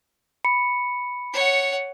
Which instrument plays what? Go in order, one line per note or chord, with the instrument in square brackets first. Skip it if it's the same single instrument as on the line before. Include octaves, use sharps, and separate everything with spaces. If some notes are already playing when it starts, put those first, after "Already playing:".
[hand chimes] B5 C#7
[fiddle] C#5 F#5